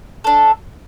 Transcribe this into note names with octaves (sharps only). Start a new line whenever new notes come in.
D4 A4